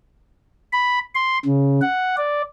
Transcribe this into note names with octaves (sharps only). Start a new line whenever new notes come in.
B5
C6
C#3
F#5
D5